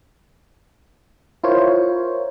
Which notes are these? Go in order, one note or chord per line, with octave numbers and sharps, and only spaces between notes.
E4 F4 A#4 C5 C#5